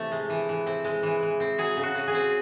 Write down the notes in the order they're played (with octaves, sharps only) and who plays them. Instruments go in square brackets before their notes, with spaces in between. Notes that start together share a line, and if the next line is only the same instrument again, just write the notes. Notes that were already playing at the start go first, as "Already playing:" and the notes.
Already playing: [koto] C3 E3 A3
G#3
E3
E3
C4
G#3
E3
E3
C4
F#3 G#4
C#3
F#4
C#3
G#4
C4